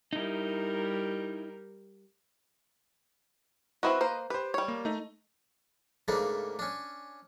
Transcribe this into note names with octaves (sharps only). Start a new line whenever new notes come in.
G3 D#4 E4 A#4
C4 E4 F#4 B4 D#5
A#3 C5
G4 B4 C5
G3 C#5
A#3
A3 D#4
G#2 C#3 A3 A#3 D4
C#4 D4